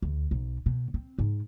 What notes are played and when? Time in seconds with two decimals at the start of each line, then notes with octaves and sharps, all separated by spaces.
0.02 D2
0.31 B1
0.66 B2
0.94 C4
1.19 G#2